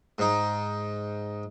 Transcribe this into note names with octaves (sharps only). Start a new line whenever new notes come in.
G#2 D#4